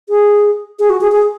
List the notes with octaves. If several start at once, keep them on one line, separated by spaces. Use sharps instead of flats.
G#4
G#4
F#4
G#4
G#4